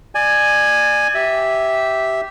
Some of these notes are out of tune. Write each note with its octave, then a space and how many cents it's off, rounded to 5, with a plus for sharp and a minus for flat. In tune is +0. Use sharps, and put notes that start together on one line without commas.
D5 +30 G#5 +0
G4 -10 E5 -5